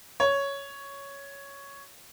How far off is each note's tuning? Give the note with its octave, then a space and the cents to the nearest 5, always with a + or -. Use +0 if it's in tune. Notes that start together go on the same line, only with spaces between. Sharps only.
C#5 +5